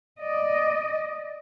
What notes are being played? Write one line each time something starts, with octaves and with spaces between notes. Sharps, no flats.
D5 D#5